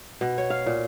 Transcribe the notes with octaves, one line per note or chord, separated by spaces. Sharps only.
B2
C#5
F5
A#2